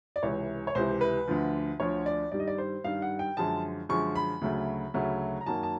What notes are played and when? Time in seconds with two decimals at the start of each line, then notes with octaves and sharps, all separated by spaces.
0.16 D5
0.23 C#2 C3 E3 C#5
0.67 C#5
0.75 C#2 C3 E3 C5
1.01 B4
1.28 D2 D3 F3
1.80 D2 D3 F3 C#5
2.06 D5
2.32 G2 D#3 G3 D5
2.39 D#5
2.47 D5
2.58 C5
2.84 G2 D#3 G3 F5
3.02 F#5
3.19 G5
3.37 F#2 D3 F3 G#3 A5
3.89 F#2 D3 F3 G#3 C#6
4.15 B5
4.41 D2 C#3 F#3 A3
4.94 D2 C#3 F#3 A3
5.41 A#5
5.46 F#2 D#3 F#3 A#3 A5
5.63 A5